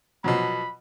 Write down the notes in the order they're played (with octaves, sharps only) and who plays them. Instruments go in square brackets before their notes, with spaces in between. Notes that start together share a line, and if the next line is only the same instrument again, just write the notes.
[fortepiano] B2 F3 F#3 [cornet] B5